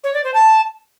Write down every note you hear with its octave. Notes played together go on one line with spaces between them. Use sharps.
C#5
D5
C5
A5